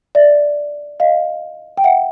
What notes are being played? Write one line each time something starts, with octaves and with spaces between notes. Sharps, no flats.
D5 E5
D#5 F5
G5
E5 F#5